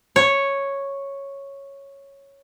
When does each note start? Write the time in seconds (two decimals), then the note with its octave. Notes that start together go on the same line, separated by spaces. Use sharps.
0.16 C#5